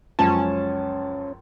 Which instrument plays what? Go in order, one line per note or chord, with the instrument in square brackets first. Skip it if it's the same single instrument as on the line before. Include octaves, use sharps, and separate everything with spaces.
[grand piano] C#2 F#2 F3 [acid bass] C#4 [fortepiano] A5